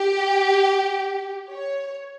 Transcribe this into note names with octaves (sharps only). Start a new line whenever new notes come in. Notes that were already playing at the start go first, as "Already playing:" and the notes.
Already playing: G4
C#5